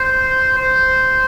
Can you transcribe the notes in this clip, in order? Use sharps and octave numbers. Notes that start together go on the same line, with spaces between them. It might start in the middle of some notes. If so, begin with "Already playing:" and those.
Already playing: C5
C5